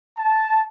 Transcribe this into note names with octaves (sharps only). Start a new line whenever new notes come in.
A5